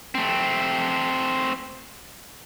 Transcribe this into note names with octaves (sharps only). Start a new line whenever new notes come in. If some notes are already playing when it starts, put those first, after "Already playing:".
A3 C4